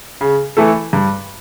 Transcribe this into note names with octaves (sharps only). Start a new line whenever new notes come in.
C#3
E3 A3 E4 A4
G2